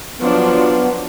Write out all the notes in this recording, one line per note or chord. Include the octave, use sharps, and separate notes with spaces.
F3 F#3 B3 D4